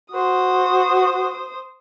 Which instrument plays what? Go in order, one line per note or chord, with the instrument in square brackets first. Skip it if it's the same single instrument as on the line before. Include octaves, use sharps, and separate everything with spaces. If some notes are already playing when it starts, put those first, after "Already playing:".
[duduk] F#4 [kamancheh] C5 D#6